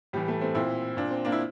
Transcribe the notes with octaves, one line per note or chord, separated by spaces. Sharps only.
A2 E3 G3
A3
A3 C4
A#2 C4 E4
A#2 D4
C4
A#3 D4
E4